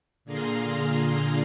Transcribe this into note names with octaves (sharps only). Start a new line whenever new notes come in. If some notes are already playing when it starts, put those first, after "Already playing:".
A#2 D3 G#4 F5 A#5 C6